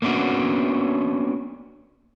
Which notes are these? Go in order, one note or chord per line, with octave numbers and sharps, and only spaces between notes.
A#3 B3 C#4 D4 F#4